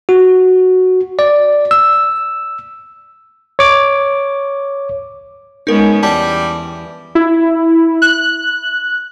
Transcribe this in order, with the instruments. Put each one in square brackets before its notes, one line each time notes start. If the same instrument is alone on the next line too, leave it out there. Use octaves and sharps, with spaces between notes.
[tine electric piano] F#4
D5
E6
C#5 D6
[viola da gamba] G#3 B3 C#4 [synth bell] D#4 A#4
[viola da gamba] E2 [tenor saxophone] G3 [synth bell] A5
[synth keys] E4
F#6